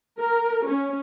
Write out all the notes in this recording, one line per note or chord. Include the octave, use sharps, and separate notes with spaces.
A#4
C#4